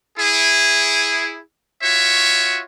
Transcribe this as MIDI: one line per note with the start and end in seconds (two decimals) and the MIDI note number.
0.19 1.40 64
0.19 1.40 68
1.83 2.62 65
1.83 2.62 66
1.83 2.62 73
1.83 2.62 76